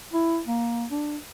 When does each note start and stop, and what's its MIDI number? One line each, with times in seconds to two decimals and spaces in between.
0.13 0.40 64
0.46 0.85 58
0.91 1.17 62